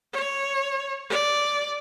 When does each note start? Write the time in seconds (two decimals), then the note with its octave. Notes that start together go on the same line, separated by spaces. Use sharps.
0.13 C#5
1.10 D5